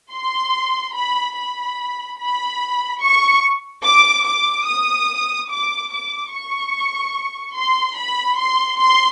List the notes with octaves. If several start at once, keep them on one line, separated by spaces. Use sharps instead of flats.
C6
B5
B5
B5
C#6
D6
D6
D#6
D6
D6
C#6
C6
B5
C6
C6